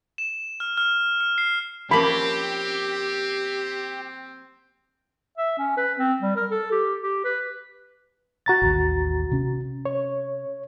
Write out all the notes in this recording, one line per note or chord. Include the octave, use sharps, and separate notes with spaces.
E7
F6
F6
F6
C7
F3 A#3 C4 C#4 G4 B5
E5
C#4
B4
C4
G3
A#4
A4
G4
G4
B4
F#4 A#5 A6
A1 D#2
C3 C#4
C#5